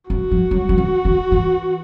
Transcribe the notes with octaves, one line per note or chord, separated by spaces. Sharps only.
F3 F#4
F3
F#3
F3
E3
D#3
E3